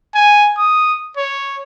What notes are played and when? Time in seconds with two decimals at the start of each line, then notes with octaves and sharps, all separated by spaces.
0.15 G#5
0.58 D#6
1.17 C#5